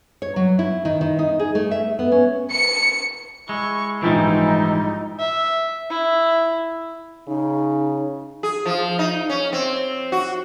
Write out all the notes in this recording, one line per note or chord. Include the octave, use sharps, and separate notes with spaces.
C#5
F#3
E4
D#3
D#3
D#4
G#4
A3
E5
B3
C#4
C#7
G#3 E4 C#6
A#1 G#2 E3 G3 G#3 D#4
E5
E4
C#3 D#4
G#4
F3
D#4
C#4
C4
F#4